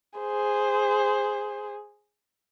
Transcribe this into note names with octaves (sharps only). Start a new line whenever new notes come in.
G#4 C5